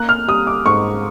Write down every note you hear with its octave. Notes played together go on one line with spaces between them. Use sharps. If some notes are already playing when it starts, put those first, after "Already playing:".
Already playing: A#3 F#6
F6
G3 D#6
D6
G#2 C#6